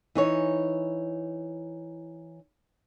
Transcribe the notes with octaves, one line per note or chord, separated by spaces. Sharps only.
E3 D#4 C#5